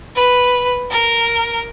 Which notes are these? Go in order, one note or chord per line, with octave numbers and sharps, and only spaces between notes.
B4
A#4